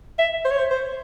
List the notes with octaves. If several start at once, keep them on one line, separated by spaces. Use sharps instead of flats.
E5
C5
C#5
C5
C5